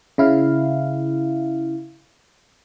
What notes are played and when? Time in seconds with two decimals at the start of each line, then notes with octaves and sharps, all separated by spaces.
0.18 C#3 E4 F5